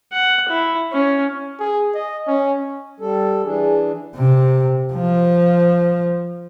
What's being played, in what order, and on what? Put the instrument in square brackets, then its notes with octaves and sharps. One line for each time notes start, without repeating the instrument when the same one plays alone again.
[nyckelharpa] F#5
E4
C#4
[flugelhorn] G#4
D#5
C#4
[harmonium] G3 A4
[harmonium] E3 D4 [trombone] G#4
[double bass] C3
F3